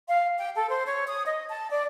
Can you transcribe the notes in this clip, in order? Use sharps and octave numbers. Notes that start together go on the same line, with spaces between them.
F5
G5
A4
C5
C#5
D#6
D#5
A5
D5